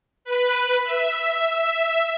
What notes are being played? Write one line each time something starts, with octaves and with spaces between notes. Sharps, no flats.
B4
E5